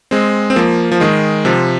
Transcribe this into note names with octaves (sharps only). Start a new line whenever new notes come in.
G#3 C4
C4
F3 A#3
F3
D#3 G#3
C3 F3